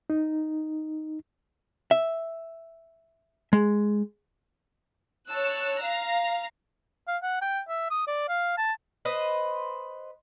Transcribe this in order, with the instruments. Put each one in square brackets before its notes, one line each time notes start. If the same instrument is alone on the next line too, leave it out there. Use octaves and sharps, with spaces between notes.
[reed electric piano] D#4
[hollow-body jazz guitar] E5
G#3
[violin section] C#5 A5 E6 F#6
F5 A#5
[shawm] F5
F#5
G5
E5
D#6
D5
F5
A5
[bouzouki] B4 C5 D#5